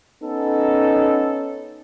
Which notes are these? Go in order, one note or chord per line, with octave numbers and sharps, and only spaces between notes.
B3 C#4 D#4 A4